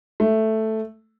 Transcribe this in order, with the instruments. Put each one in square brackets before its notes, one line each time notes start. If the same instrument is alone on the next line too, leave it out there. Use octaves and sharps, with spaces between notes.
[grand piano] A3